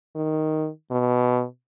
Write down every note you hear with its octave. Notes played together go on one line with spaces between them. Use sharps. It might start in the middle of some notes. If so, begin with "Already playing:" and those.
D#3
B2